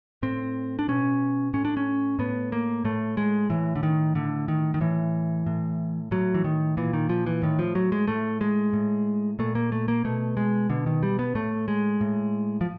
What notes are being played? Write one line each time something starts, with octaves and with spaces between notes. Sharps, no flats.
A2 C4
D4
B2 C#4
A2 C#4
D4
C#4
A2 B3
A#3
A2 A3
G#3
A2 E3
D3
D#3
A2 D3
D#3
D#3
A2 E3
A2
A2 F#3
E3
D#3
A#2 E3
D#3
F3
E3
A2 D#3
F3
F#3
G#3
A2 A3
G#3
A2
A#2 A3
A#3
A3
A#3
B2 A3
G#3
B2 D3
D#3
G3
B3
A2 A3
G#3
A2
F3